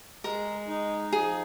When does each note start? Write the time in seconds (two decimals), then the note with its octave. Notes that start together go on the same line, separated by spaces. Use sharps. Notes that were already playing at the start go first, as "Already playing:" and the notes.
0.24 G#3 A#4
0.68 D#4
1.12 F3 G#4